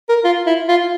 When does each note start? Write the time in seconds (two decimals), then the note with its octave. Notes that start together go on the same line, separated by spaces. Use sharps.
0.09 A#4
0.24 F4
0.46 E4
0.69 F4